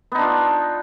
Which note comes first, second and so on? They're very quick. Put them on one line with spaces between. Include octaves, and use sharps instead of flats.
B3 D#4 D4 F4